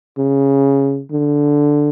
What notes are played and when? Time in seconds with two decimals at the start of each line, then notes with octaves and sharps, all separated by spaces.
0.18 C#3
1.12 D3